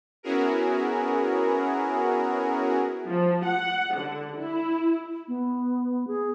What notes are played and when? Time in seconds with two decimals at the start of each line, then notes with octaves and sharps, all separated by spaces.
0.23 B3 C#4 E4 F#4 G#4 A#4
3.06 F3
3.44 F#5
3.97 D3
4.37 E4
5.28 B3
6.07 G#4